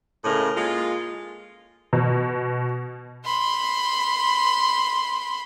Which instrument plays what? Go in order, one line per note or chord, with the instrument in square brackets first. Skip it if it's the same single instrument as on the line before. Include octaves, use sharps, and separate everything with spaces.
[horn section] A2 C#3 E4 A#4 D#5
G#3 A#3 F4
[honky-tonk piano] B2
[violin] B5 C6